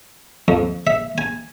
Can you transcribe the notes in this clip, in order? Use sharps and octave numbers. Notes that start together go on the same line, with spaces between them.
F2
E5
G#5